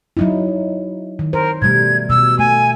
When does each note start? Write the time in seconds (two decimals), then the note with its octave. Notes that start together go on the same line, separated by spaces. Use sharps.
0.17 F#3 D#4 E4
1.19 D#3
1.33 A#4 C5
1.62 B2 G3 A3 G#6
2.10 B2 E6
2.39 A3 G#5